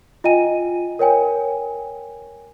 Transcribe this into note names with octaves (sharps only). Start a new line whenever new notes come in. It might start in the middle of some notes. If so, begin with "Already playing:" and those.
F4 D#5 G5 G#5 D#7
A#4 C#5 G5 G#5